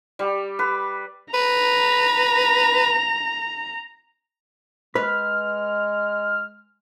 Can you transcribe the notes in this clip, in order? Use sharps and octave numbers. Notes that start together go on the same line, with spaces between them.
G3
B4
B4 A#5
G#3 B4 F6